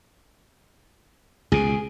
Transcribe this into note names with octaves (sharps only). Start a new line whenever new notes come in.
C#2 B2 G#4